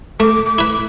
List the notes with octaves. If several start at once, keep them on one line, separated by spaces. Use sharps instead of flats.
A3 D6
D6
E4 B4
D6